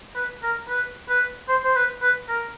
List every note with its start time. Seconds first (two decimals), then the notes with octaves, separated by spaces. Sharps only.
0.16 B4
0.43 A#4
0.69 B4
1.09 B4
1.48 C5
1.64 C5
1.76 B4
2.02 B4
2.29 A#4